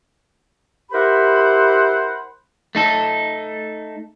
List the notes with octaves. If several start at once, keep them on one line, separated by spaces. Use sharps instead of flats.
E4 G4 A#4 C5 F#5 B5
A3 D#4 A4